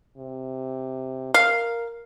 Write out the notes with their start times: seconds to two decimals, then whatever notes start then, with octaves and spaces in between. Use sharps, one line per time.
0.17 C3
1.34 A#4 F5